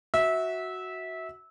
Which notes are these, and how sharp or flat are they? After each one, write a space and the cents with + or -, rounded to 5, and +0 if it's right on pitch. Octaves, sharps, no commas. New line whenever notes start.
F#4 +0 E5 -20